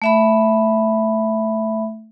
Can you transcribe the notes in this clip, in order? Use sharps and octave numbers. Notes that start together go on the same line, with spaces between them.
A3 E5 B5